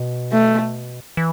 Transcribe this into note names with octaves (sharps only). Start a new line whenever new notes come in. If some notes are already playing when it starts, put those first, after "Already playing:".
Already playing: B2
A3
E3